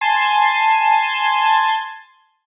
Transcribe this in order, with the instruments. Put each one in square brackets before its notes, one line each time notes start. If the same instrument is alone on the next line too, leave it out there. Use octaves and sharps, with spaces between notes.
[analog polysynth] G#5 A5 C6